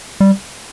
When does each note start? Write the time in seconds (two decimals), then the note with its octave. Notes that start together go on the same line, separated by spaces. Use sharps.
0.20 G3